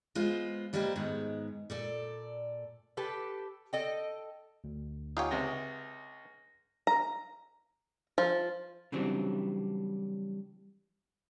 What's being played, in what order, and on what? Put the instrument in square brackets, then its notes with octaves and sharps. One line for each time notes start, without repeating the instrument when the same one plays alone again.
[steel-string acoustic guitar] G#3 B3 F4 C5
E3 G3 G#3 A#3 G4 C5
G#2 D#3 G#3 B3
A#2 A4 D5
[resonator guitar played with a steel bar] G4 A4 B4
A4 D#5 G5
[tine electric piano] D2
[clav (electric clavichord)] D#4 G4 C#5 [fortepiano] F4 [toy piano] F#5 G#5 D#6
[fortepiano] C#2 C3 [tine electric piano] A#6
[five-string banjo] A#5
F3
[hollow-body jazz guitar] C#3 E3 F#3 G3 C4 D4